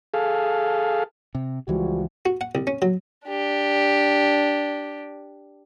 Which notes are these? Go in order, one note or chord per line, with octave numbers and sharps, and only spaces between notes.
G#4 A4 F5
C3
C#2 E3 F3 G3 G#3 F#4
F#4
F#5
C2
C#4
F#3
D4 G4